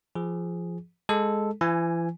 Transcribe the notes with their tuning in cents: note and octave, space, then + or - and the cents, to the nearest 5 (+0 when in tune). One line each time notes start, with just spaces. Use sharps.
F3 -15 G#4 +0
G#3 +0 A4 -5
E3 +40 G#5 +0